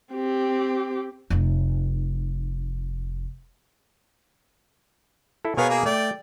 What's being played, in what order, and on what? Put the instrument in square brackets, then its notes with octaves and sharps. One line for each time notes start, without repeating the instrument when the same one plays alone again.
[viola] C4 G4
[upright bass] F1 D#4
[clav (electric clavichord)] E4 A4
[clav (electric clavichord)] B2 A#4 F5 [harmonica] B3 G#4 C#5
[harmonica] A#3 G#4
[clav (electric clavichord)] A3 [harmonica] D5 G5